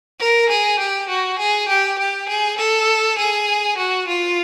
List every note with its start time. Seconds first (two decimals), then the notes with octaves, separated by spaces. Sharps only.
0.20 A#4
0.49 G#4
0.79 G4
1.09 F#4
1.39 G#4
1.69 G4
1.99 G4
2.29 G#4
2.58 A4
3.18 G#4
3.78 F#4
4.08 F4